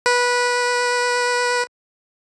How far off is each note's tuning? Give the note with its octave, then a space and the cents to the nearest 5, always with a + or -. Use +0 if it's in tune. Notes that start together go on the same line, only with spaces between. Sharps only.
B4 -15